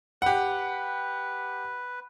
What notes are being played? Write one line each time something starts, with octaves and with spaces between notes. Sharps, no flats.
G4 B4 F#5